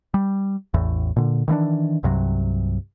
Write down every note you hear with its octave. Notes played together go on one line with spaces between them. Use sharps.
G3
A1 E2 A2
A#2 D3
D#3 E3 A#3 D4
C2 G2 C3 F#3